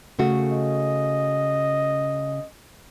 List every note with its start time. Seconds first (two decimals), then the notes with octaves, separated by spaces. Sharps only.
0.19 C#3 A3 F#4
0.52 D#5